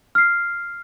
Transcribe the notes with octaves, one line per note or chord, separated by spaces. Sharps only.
F6 C7